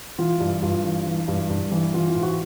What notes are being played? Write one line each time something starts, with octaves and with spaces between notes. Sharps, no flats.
E3 F4
G2
G2 F4
E3
E3
G2
G2
E3
E3 F4
F4
G#2
F#4